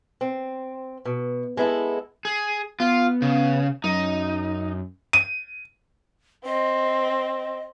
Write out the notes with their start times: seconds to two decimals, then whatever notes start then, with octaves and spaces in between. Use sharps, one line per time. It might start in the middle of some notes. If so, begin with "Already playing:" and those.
0.21 C4
1.05 B2
1.57 G#3 B3 E4 A4
2.25 G#4
2.80 B3 F4
3.22 C#3
3.84 F#2 D#4
5.13 D#7
6.46 C4 D#5